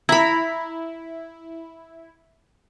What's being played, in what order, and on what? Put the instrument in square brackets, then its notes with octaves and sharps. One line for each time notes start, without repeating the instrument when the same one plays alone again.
[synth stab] E4 [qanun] A#5 B5